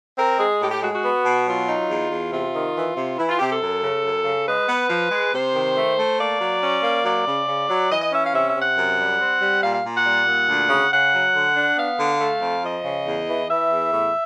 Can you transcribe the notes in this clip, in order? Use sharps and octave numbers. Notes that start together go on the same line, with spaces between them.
C4 A#4
G#3 G#4
A2 G4
G4
G#3 F#4
F#4
B3
B2
F#3 F4
D#4
E2
E2
C3 F4
D#3
E3
C3
E3 E4
F4
C3 G4
A4
F#2
C#3
F#2
C#3
G#3 B4
B3
F3
G#3
C3 C5
D#3
A3
A3
A#3 D5
F#3
C#4
A#3
F#3 D5
C#3
C#3
F#3
E3 D#5
D#5
C#4 E5
F5
C3 E5
E5
C3
F#5
F#2
G3
C4
G3
A#2 F5
F5
A#2
F#5
G3
A#2
D2
C#3
C#3 F#5
F#3
D3
D4
B3 F5
D3
A3
F2
F3 D#5
C#3
E2
E3
E3 E5
E2
A2